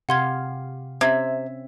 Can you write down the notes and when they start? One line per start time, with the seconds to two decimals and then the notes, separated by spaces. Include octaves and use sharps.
0.09 C3 G4 F5 F#5 C6 G#6
1.01 C3 C4 C#4 E5 G#6